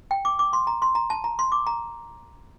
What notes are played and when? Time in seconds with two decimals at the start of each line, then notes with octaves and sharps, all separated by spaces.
0.11 G5
0.25 D6
0.39 D6
0.53 C6
0.67 A#5
0.82 C6
0.95 A#5
1.10 A5
1.24 A#5
1.39 C6
1.52 D6
1.67 A#5